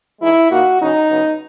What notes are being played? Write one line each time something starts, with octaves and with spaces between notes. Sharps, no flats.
E3 G#3 D#4 E4
A#2 A#3 D#4 F#4
C#3 F#3 C#4 D#4
C#3 F#3 B3